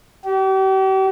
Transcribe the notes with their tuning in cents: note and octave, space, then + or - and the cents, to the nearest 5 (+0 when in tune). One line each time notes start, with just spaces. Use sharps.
G4 -40